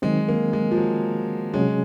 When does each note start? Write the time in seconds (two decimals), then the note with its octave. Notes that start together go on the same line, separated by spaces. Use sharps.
0.02 D#3 F#3 G#3 C4
0.28 A#3
0.53 G#3
0.71 F3
0.78 F#3
1.54 C3 F#3 G#3 C#4 G#4